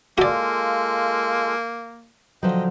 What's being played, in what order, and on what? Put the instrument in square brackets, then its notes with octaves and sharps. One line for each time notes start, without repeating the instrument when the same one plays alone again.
[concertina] G#3 F4 A4 [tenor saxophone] A#3 [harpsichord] F#4 D5
[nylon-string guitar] D3 F3 F#3 [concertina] D#5 G5